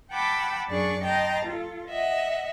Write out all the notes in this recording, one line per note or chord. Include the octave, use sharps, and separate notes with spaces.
F#5 G5 A5 B5 D6 E6
F#2 D4 G#4 D5 C#6
D#5 G5 A5 A#5 C6
F4 A4
D#5 E5 F#5